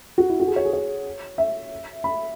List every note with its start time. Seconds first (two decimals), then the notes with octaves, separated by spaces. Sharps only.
0.18 F#4
0.29 E4
0.40 F#4
0.47 G#4
0.56 C#5
0.65 G#4
0.73 C#5
1.38 E5
2.04 B5